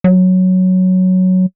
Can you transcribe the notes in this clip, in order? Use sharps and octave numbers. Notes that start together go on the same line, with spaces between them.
F#3